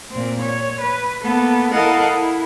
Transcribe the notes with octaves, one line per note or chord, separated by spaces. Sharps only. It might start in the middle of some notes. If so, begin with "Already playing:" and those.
A#2 C4
C#5
B4
A#3 B3 A4
E4 A4 A#4 D#5 F5 F#5
E4